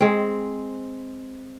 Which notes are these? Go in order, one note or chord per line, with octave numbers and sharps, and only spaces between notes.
G#3 C4